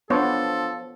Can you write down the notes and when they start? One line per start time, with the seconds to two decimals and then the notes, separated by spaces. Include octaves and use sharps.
0.10 F3 B3 D4 A4 C#5 C6